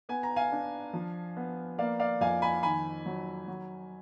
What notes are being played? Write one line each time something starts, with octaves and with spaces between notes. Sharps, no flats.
B3 G#5
A#5
F5 G#5
D4
F3
B3
A#3 D5 F5
D5 F5
F2 F5 G#5
G#5 B5
D#3 G#5 B5
F#3
F#3